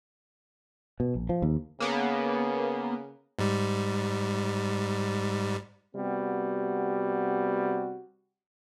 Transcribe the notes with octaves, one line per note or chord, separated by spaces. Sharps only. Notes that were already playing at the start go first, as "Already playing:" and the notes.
B2
A#1
F3
D#2
C#3 A#3 B3
G#2 G3
C3 G3 B3 F#4